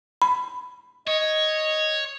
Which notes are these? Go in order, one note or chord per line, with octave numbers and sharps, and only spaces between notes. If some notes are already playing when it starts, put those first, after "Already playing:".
B5
C#5 D#5